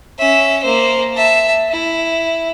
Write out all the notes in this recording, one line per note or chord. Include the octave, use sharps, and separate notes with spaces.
C#4 E5
A#3 C5
E5 A5
E4